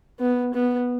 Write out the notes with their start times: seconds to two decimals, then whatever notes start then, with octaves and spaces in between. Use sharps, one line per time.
0.20 B3
0.54 B3